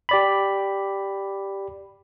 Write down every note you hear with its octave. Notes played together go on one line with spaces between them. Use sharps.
G4 D5 B5